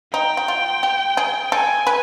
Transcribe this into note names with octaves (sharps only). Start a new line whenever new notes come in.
D#4 G5
F#4
F4
G4
G#4
A4 G#5
B4